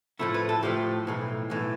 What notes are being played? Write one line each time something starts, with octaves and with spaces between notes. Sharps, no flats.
A2 F3 A3 E4
B4
A4
A2 F3 A3 G4
B1 A2 E3
B1 A2 E3